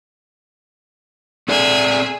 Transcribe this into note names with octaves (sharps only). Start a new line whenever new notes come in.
C4 G#4 A4 D5 E5